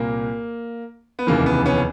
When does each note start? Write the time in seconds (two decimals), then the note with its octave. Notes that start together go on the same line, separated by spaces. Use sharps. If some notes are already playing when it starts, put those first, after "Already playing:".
Already playing: C2 A#2 A#3
1.19 B3
1.27 F1 D#2 C#3 E3 A#3
1.46 B3
1.66 B3 C#4